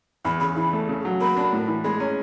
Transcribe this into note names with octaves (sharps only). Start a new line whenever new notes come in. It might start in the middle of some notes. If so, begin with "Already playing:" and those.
E2 B5
C#3 B5
E3 B5
A3
C#3
F#3
A#3 B5
D4
A2
E3
G#3 B5
C#4 A#5